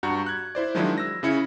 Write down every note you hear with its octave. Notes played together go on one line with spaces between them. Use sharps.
G2 F#4 F#5 A#5 C#6 G6
F#6 G#6
E4 C5 D5
D#3 F3 F#3 G#3 D4 E4
E6 A#6
C#3 C#4 E4 C#7